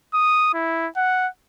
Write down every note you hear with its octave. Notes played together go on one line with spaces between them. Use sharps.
D#6
E4
F#5